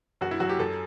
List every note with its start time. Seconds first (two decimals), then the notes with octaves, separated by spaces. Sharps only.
0.21 F#2 F#4
0.31 E4
0.40 F#3 F#4
0.49 G4
0.59 F#2 A4